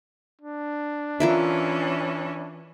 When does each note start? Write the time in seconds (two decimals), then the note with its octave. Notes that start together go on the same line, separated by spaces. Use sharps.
0.42 D4
1.20 E3 C#4 F4 A#4 E5